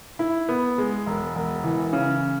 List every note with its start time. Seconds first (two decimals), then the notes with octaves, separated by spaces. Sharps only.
0.19 E4
0.49 B3
0.78 G#3
1.06 E1
1.35 E1
1.64 E3
1.93 C#3